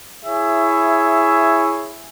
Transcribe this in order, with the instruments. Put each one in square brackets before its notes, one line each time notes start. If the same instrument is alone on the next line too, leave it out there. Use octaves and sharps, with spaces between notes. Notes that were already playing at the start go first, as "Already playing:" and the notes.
[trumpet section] E4 G#4 C#5 E5